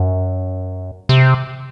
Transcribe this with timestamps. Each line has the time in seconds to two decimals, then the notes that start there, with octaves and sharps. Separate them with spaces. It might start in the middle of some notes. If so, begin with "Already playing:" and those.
Already playing: F#2
1.09 C3